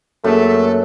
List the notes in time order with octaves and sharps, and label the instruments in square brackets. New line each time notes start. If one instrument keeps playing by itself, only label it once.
[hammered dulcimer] F#2 [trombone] A3 [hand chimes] A#3 G#4 [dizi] A4